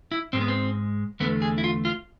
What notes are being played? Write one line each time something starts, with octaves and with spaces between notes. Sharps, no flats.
E4
G#2 G#3 C4
B3
C4
E2 D3 A3 B3
G#4
E4
F4
F4